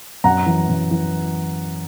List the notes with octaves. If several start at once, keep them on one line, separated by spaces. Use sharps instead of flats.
F#2 F#5 A#5
E3
F#2
E3